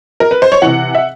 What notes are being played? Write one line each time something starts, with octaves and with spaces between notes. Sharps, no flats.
A#4
B4
C5
C#5
C3 E3 F#5
E5